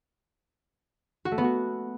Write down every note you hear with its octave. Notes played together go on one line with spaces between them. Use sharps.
F#4
A3
B3
F#4